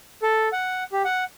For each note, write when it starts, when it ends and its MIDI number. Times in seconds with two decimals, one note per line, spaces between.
0.22 0.49 69
0.53 0.84 78
0.92 1.02 67
1.05 1.24 78